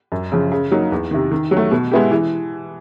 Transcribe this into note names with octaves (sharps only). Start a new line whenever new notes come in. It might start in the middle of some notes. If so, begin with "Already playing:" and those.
F#2
C#3 F3
C#3
F#3 A#3 D#4
E2
C3 D#3
D#3
F#3
A3
B2
G#3 B3 E4 G4
E3